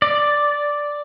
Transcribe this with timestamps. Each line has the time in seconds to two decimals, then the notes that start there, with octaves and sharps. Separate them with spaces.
0.02 D5